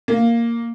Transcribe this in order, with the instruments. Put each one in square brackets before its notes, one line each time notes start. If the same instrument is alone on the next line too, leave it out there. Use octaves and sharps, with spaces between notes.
[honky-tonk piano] A#3